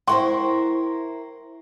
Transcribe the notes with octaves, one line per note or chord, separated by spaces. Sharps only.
E4 A#4 C5 G5 C6 C#6